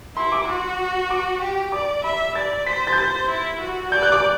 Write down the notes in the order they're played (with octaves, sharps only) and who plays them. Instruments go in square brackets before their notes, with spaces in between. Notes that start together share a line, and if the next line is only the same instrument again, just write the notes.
[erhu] E4 [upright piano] C6
[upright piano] D6
[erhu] F#4
[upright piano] D6
[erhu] G4
[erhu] D5 [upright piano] D6
[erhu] E5 [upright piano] B5
[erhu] D5 [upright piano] A6
[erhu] C5 [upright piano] B6
[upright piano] A6
G6
[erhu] C5 [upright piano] A6
[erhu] E4
F#4
[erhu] D5 [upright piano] G6
[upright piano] F#6
D6